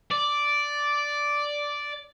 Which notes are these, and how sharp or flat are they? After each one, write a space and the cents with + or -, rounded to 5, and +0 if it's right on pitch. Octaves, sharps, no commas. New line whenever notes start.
D5 -5